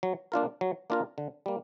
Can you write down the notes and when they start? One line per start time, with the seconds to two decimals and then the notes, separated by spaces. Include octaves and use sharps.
0.03 F#3
0.32 A#3 D4 F4 A#4
0.61 F#3
0.90 A#3 D4 F4 A#4
1.18 D3
1.46 G3 A#3